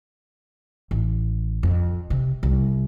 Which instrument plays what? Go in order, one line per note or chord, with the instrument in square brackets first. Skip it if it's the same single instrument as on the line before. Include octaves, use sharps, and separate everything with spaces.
[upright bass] A1
F2
C3
C2